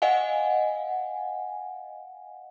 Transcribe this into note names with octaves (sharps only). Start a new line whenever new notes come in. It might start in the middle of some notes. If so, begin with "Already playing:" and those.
D#5 F5 F#5 G#5